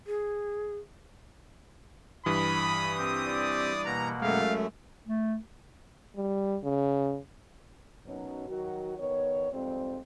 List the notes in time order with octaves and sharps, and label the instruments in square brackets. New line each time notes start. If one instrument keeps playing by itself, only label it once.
[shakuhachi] G#4
[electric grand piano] G2 E3 [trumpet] B5 [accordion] D#6
[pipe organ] C4 G4
[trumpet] D5
[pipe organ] B2 A#3 F#5 [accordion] A#5
[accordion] F#2 A3 [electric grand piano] G#3 [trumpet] F5
[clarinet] A3
[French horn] G3
C#3
[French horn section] F#2 B2 F#3 C#4 D#4
D#3 F#3 F#4
D#3 B3 C#5
F2 G#2 G3 C4